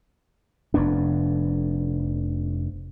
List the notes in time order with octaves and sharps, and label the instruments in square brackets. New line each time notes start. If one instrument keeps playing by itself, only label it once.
[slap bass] F1 F2 B3 D4